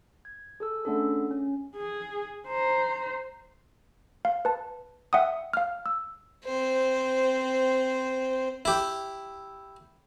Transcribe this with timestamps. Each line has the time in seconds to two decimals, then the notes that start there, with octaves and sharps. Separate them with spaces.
0.25 G#6
0.60 G#4 A4 E6
0.85 A3 B3 C#4 D4 G#4 A4
1.31 C#4
1.77 G#4
2.48 C5 A#5
4.25 F5
4.45 B4 A5
5.13 E5 F#5 G5 D#6
5.53 F5 F6
5.86 E6
6.45 C4 C5
8.65 E4 G4